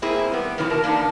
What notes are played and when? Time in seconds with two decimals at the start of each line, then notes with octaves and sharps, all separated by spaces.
0.02 A#3 C4 E4 G#4
0.32 G3 B3
0.58 F#2 B2 E3 F#3 E4
0.70 A#4 A5
0.84 A#3 D4 D#4